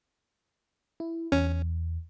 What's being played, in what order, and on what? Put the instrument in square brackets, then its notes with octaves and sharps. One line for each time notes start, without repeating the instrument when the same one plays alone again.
[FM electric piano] E4
[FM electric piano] E2 [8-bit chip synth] C#4